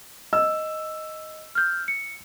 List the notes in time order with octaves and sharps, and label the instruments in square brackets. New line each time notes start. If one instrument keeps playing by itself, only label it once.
[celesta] D#5 [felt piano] E6
[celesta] F6 G6
C#7